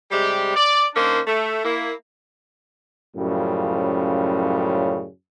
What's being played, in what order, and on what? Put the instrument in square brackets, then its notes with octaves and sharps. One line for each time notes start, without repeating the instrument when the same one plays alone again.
[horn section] C3 G3 G#3 G4
D5
D#3 A#3 C#4 D4 C5
A3
A#3 E4
[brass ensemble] F#2 A2 C#3 F3 G3